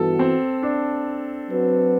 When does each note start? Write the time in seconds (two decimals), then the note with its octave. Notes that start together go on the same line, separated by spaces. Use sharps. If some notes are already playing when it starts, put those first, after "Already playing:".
Already playing: G2 E3 B3 F#4 A4
0.19 C4
0.63 D4
1.50 F#3 C4 F#4 B4